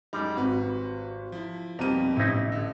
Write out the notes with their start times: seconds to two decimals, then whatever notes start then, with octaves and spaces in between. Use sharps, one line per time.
0.13 F#2 G3 G#3 D#4
0.37 G#1 F#4 B4
1.32 F3 E4
1.79 F2 B2 F3 G3 A#3 D#4 A#4 D#7
2.17 A1 D#4 E4
2.52 D3